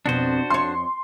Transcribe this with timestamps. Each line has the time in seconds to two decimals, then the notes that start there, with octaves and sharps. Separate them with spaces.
0.06 F2 B2 D4 F#4 C5
0.50 F2 C#5 C6